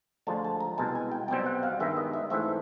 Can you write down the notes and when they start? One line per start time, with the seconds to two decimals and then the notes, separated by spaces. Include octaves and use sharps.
0.27 D2 D3 F3 G#3 A5
0.44 A5
0.60 A#5
0.78 C2 B2 G#3 B3 A5
0.95 G#5
1.11 G5
1.28 B1 B2 G3 C4 G5
1.46 F#5
1.63 F5
1.79 G2 D#3 G#3 B3 E5
1.97 D#5
2.13 E5
2.30 G#2 E3 A3 C4 E5